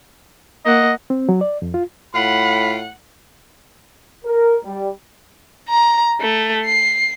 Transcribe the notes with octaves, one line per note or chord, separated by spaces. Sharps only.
A#3 D#5 F#5
C4
F#3
D5
F2
F4
A2 F4 F#5 B5
A#4
G3
A#5
A3
C7